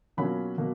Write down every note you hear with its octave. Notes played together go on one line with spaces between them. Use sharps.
B2 F#3 A#3 C#4 F4 B5
B2 F#3 A#3